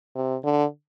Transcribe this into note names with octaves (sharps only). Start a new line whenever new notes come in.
C3
D3